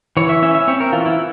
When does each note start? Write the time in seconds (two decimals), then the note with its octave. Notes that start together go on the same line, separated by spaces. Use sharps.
0.17 E3 C#5
0.29 E5
0.42 C#4 E5
0.55 E5
0.68 C4 C#5
0.80 A#4
0.93 E3 F4
1.06 E4